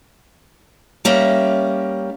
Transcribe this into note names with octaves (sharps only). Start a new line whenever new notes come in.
G3 A#3 C#4 E5